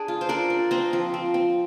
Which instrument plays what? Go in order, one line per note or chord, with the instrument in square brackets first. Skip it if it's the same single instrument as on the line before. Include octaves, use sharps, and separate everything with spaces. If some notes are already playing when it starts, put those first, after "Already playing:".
Already playing: [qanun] D4 G#4 D5
F4
C5
D4 A#4 D5
D4
C4 C5 D#5
F3
C4
C4